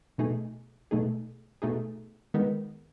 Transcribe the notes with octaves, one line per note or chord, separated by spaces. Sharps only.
B2 A3 D#4 G#4
B2 A3 D#4 G#4
B2 A3 D#4 G#4
D#3 G#3 B3 D#4